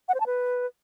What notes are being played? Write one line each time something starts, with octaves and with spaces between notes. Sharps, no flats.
F#5
C5
A5
B4